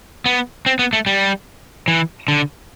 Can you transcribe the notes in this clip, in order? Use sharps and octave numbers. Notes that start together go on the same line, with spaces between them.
B3
C4
B3
A3
G3
E3
D3